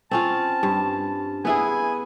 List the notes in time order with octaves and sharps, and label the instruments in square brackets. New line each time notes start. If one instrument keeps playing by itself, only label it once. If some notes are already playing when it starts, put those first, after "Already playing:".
[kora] C4 C#4 F4 [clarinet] A5
[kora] G2
[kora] B3 E4 G#4 [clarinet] G#5